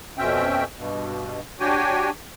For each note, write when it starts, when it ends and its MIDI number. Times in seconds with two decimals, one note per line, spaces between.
0.18 0.64 41
0.18 0.64 47
0.18 0.64 60
0.18 0.64 61
0.18 0.64 76
0.18 0.64 79
0.77 1.40 43
0.77 1.40 47
1.60 2.10 62
1.60 2.10 66
1.60 2.10 67
1.60 2.10 73
1.60 2.10 79
1.60 2.10 80